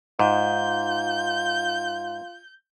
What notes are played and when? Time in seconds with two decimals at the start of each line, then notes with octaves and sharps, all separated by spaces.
0.19 G#2 F4 G6